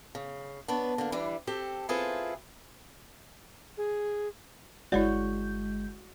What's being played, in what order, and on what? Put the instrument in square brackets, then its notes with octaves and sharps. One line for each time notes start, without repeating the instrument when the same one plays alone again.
[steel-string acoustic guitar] C#3
B3 D4 B4 C#5
D3 A#3
E3 G3 D4
C4 G4 A4
C4 E4 F4 G#4 A4 B4
[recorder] G#4
[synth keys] G1 G#3 G6 [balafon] E4 C#5 D5 [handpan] F#4 F#5